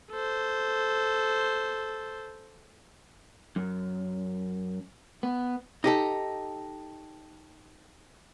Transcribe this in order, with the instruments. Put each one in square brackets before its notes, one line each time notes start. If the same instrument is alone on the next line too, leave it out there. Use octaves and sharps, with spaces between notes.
[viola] A4 C5
[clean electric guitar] F#2
B3
[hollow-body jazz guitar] D#4 G4 A4